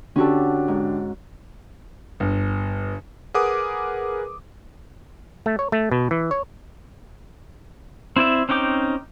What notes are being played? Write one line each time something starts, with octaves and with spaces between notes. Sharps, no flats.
D3 C#4 D4 F#4 G4 A4
G#2
G1
G#4 A#4 B4 F#5 D6 D#6
A3
C#5
A3
B2
E3
C#5
C4 E4 D5 E5
C4 C#4 D#4 G5 D6